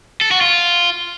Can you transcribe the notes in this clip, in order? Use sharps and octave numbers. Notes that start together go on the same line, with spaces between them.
A4
F#4
F4